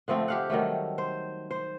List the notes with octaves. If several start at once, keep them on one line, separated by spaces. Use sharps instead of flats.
D3 F3 A3 C4
G4 F5 F#5
D#3 F#3 G3 A3
C5
C5